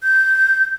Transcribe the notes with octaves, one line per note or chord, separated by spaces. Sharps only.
G6